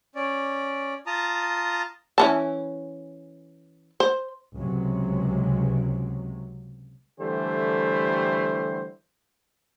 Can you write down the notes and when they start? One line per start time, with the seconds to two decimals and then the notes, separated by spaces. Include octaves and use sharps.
0.15 C#4 D5
1.07 F4 A5 A#5 D#6
2.18 E3 C#4 A5
4.00 C5
4.56 C#2 C3 F#3 G#3
7.19 D3 E3 G3 A3 G4 C5